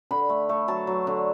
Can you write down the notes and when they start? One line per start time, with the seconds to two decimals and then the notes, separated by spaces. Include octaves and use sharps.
0.11 D3 B5
0.29 A3
0.49 A3
0.68 F#3 A5
0.87 F#3
1.07 D3